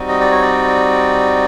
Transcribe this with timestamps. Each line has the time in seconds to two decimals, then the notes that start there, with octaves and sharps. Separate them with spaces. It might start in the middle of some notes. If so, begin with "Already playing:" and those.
Already playing: G3 C4 D#4 F#4
0.09 D#5
0.21 D5
0.32 C#5
0.42 D5